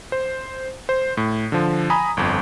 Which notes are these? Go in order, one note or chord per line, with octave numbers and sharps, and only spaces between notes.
C5
C5
A2
D3 F3
G#5 A#5 B5 D#6
G1 F2